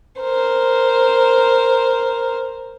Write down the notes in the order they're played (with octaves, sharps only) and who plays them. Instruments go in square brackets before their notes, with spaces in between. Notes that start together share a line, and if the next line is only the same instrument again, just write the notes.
[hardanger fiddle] A#4 C5